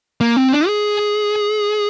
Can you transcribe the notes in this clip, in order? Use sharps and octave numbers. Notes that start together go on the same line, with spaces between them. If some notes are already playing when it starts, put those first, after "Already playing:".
A#3
C4
D4
G#4